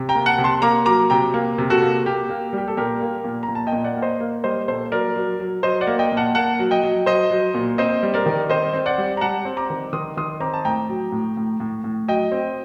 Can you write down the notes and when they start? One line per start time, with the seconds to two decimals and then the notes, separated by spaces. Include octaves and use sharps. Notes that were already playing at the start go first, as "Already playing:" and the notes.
Already playing: C3
0.09 G5 A#5
0.15 A#3
0.26 F#5 A5
0.38 C3
0.44 A5 C6
0.62 A#3 A#5 D6
0.86 F#3 A#5 D6
1.10 C3 G5 A#5
1.34 A#3
1.58 C3
1.70 F#4 A4
1.82 A#3
2.06 A#3 G4
2.30 A#3
2.53 G3 G4
2.68 A4
2.77 A#2 G4 A#4
3.01 A#3
3.24 A#2
3.43 A#5
3.48 A#2
3.55 A5
3.67 D#5 G5
3.73 A#2
3.84 D5 F#5
3.96 A#3
4.02 C5 D#5
4.20 A#3
4.44 G3 C5 D#5
4.68 A#2 A4 C5
4.92 F#3 A#4 D5
5.16 F#3
5.40 F#3
5.63 F#3 C5 D#5
5.81 D5 F#5
5.87 A#3
5.99 D#5 G5
6.12 A#2
6.17 F#5 A5
6.35 A#3 F#5 A5
6.59 F#3
6.71 D#5 G5
6.83 F#3
7.06 F#3 C5 D#5
7.31 F#3
7.54 A#2
7.78 C4 C5 D#5
8.03 G3
8.14 A#4 D5
8.26 D#3
8.50 C4 C5 D#5
8.73 C4
8.86 D5 F#5
8.98 G3
9.17 A#5
9.21 G3 F#5 A5
9.45 C4
9.57 A#5 D6
9.70 D#3
9.93 D#3 C6 D#6
10.17 D#3 C6 D#6
10.40 C4 A#5 D6
10.54 A5
10.65 A2 G5 A#5
10.89 F#3
11.12 A2
11.37 A2
11.60 A2
11.84 A2
12.08 F#3 D#5 G5
12.32 C4